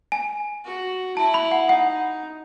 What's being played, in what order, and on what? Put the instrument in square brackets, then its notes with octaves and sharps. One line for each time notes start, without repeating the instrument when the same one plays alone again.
[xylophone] G#5
[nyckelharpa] F#4
[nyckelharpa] E4 [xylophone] A5
[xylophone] B5
F#5
[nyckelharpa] D#4 [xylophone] F#5